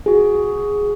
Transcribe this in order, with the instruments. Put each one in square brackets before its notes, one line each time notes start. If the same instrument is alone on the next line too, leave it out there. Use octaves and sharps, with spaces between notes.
[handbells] F#4 G#4